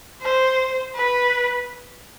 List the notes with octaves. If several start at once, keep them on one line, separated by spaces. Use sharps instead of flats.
C5
B4